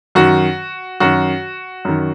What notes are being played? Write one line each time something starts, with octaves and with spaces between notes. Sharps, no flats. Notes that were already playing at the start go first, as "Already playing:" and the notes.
F#2 D#3 F#4
F#2 D#3 F#4
F#2 D#3